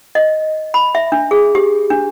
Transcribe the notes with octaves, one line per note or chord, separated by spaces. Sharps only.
D#5
B5
E5
D4
G#4
G4
D4